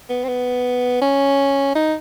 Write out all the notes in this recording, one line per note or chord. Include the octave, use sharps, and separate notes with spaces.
B3
C4
B3
C#4
D#4